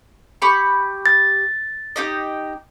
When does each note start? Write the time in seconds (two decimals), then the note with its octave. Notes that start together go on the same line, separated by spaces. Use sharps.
0.42 G4 B5 C#6
1.06 A6
1.96 D#4 G4 D#5